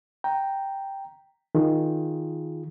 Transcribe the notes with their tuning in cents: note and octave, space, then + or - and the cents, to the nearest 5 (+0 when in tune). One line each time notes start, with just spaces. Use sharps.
G5 +0 A#5 +0
D#3 +10 F4 +0 G#4 +0